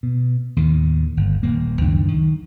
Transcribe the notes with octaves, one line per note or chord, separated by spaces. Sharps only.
B2
D#2 A2 D#3
G1
D#1 A#3
C#2 F#2 D#3 D4
D#3